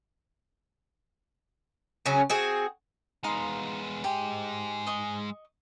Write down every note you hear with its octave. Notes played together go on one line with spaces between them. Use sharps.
C#3 F#3 C#4
C4 F#4 G#4
G#3 B3 D#4 F5 C6
G#2 G#3 G4
D#5 C#6